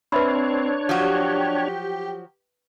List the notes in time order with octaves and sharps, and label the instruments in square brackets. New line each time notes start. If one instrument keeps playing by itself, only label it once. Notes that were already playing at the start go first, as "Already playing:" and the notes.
[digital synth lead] C4 [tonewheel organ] D4 C#5 [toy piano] B4 E5 B5
[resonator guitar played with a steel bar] F3 F#3 F#4 [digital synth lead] G4